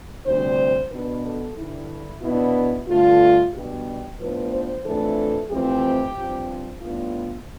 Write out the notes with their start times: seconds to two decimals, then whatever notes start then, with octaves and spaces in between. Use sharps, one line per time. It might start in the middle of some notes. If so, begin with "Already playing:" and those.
0.24 D2 C3 G3 D4 C5
0.90 B2 B3 D4 B4
1.23 A4
1.55 G2 D3 G3 E4
2.21 B2 B3 D4 E4
2.87 G2 D3 A3 F4
3.53 B2 G3 B3 D4 G4
4.19 A2 F3 B3 D4 B4
4.52 C5
4.84 F2 E3 A3 D4 A4
5.50 F2 E3 A3 C4 G4
6.16 G2 F3 C4
6.82 A2 G3 B3 D4 F4